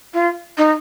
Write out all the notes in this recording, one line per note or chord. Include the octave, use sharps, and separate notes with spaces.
F4
D#4